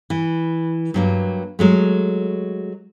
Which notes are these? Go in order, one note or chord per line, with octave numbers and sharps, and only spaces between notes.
E3
G2 F#3 A#3
F#3 G#3 A3